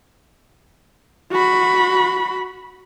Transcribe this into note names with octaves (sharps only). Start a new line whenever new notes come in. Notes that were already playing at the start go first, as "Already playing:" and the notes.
F#4 B5